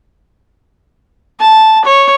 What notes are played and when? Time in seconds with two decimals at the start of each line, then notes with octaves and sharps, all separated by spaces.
1.40 A5
1.85 C#5